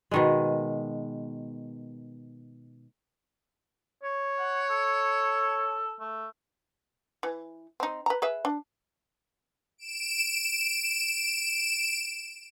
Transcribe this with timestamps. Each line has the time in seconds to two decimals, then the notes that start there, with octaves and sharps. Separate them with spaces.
0.11 B2 D#3 G#3
4.03 C#5
4.39 F#5
4.70 A4
6.00 A3
7.23 E3
7.80 C4 D#4
8.06 B4 A#5
8.22 G#4 B4 E5
8.45 D4
9.78 D7 E7